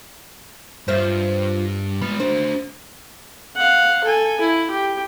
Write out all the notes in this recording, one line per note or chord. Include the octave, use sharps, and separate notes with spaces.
G2 F4 C5 E5
G#3 B3 F4 B5
C4 D4 F#4
F5 F#5
A4 G#5
E4
G4